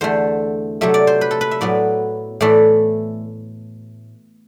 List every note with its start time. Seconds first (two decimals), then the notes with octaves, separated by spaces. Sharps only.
0.01 E2 D3 A3 C5
0.81 C3 F#3 A3 E5
0.94 D5
1.07 C5
1.21 B4
1.31 A4
1.41 B4
1.51 E5
1.61 A2 F#3 B3 D5
2.41 A2 E3 A3 E4 D5